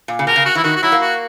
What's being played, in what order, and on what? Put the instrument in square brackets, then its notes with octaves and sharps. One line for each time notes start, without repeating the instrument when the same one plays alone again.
[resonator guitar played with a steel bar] A#2
C#3
[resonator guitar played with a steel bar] B2 [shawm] A#4
[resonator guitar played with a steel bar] C#3
[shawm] F#4
[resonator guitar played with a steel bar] E3 [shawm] E4
[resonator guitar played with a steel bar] D#3 [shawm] F#4
[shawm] F#4
[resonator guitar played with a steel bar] F#3 [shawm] E4
[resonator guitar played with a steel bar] A#3
[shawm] F#4